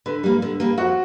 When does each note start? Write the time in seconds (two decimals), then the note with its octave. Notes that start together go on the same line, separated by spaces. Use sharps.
0.06 D3 B4
0.24 G3 A#3
0.42 D3
0.60 G3 A#3
0.78 F2 F#4